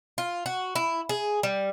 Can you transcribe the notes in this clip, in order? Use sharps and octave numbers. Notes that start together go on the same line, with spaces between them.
F4
F#4
E4
G#4
G3